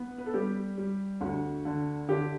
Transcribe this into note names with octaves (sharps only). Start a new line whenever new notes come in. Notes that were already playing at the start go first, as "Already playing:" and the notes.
Already playing: B3
B4
A4
G3 G4
G3
D2 F#4
D3
D3 G4